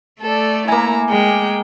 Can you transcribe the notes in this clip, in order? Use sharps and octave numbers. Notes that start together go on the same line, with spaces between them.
A3 A4 D5
A#3 E4 G#5 A#5
G#3 G5